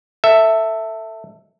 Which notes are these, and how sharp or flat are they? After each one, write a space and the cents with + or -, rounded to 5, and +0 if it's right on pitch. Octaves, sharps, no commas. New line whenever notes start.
A4 +20 E5 +0